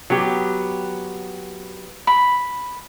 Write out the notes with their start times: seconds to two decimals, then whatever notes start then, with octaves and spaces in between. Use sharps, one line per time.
0.10 F#3 B3 G4
2.07 B5